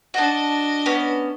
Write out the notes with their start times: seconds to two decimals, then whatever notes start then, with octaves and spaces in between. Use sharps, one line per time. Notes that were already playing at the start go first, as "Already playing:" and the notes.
0.14 D4 F#4 D#5 A5
0.86 B3 C#4